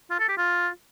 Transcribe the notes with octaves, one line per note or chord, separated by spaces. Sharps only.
F4
A4
G4
F4